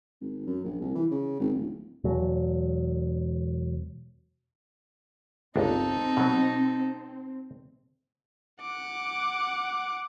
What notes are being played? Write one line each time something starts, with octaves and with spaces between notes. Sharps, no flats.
G#1
F#2
A#1
C2
E3
C#3
G#1
D1
E1 F#3
G1 C#2 C4 D4 D#4 A4
B2 F#3
F#5 D6